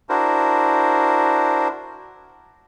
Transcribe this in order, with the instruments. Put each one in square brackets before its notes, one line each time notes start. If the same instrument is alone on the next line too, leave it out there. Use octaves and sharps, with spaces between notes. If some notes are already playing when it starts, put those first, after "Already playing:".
[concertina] D4 E4 F#4 A#4 C5